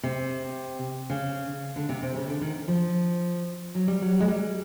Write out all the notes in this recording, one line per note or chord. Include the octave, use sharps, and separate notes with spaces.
C3
C#3
D3
C3
C3
C#3
D3
D#3
F3
F#3
G3
F#3
G#3
G3